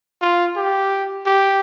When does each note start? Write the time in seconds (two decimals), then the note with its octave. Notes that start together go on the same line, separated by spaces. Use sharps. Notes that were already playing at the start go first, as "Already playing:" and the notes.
0.21 F4
0.56 G4
1.26 G4